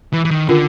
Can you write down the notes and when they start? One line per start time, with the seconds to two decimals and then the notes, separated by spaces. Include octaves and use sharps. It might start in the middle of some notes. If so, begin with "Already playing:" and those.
0.13 E3
0.25 E3
0.31 D#3
0.48 D3 C#4 F4 A#4